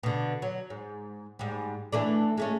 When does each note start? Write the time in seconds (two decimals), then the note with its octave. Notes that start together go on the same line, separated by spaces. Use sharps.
0.03 B2 D3
0.42 F#3
0.70 G#2
1.39 G#2 G3
1.93 E3 A3 D4
2.38 G#3 A3 C#4